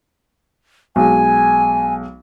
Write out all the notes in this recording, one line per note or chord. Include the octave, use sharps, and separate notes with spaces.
B1 G#3 G#5